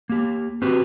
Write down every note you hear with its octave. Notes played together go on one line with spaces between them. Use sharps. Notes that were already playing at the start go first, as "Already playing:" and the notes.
A#3 G4
C4 F#4 G4 B4